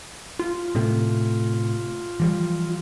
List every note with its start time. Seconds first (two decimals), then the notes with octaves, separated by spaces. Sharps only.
0.39 F4
0.75 A2 C3 A3
2.20 E3 F3 G3